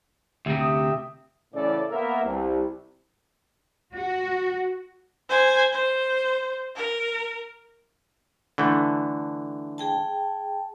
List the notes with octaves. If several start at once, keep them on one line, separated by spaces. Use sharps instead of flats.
D2 C3 G4 E5
D#6
A2 C#3 E3 C#4 A4 D5
A#3 B3 A#4 E5
C2
F#4
C5 G#5
C5
A#4
D3 E3 A3
G#4 G5 A5